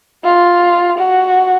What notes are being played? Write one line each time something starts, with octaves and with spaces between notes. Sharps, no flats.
F4
F#4